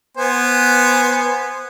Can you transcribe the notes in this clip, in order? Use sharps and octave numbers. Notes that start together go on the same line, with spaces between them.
B3 C5 G#5